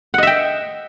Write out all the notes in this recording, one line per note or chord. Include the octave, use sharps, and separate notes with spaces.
D#5 E5 F#5 G5